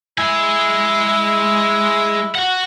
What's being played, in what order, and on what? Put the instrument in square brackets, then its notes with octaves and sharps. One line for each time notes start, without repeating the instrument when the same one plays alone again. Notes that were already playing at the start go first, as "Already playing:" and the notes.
[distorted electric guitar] G#3 G#5 [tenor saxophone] E4
[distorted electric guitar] F#4 F#5